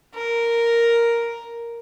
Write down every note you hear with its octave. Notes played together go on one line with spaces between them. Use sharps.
A#4